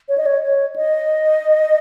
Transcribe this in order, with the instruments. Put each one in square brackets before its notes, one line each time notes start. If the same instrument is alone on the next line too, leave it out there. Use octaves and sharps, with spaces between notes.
[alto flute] C#5
D#5
C#5
C#5
D#5